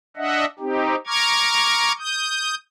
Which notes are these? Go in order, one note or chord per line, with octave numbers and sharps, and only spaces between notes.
D4 D#5 E5 F#5
C4 D#4 G4
A#5 C#6 D6 F6 G#6
D#6 G6